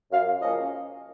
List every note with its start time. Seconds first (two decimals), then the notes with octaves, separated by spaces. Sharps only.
0.11 F#2 F5
0.40 C#3 F3 A#3 C#4 D#5